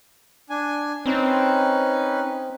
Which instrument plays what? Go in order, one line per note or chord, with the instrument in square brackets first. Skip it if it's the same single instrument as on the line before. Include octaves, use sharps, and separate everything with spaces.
[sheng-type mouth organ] D4 G#5
[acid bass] C4 [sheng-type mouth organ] C#4 D#4 B4